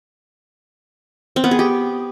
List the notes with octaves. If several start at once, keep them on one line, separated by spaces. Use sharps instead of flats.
C4
B3
G#4
G4